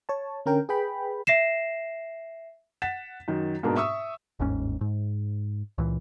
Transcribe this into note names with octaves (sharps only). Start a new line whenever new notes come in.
C#5 A5
D3 C#4 A#4 G5
G#4 B4 G5 B5
E5 A#6 C7 E7
F#5 A6 B6 E7
F#2 D#3
G#2 B2 A#3 D4
E5 C#6 D#6 E6
G1 D#2 G#2 C#4
G#2
C#2 A#2 E3